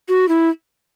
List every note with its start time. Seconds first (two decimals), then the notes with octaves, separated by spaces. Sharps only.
0.09 F#4
0.29 E4